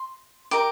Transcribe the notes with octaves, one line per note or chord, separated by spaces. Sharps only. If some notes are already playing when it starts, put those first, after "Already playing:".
Already playing: C6
G4 A#4 D#5 D6